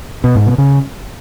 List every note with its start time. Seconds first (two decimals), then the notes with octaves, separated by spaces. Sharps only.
0.24 B2
0.35 G#2
0.47 B2
0.58 C#3